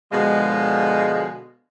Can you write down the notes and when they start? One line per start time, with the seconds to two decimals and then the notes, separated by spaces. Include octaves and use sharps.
0.12 B2 D3 F3 G#3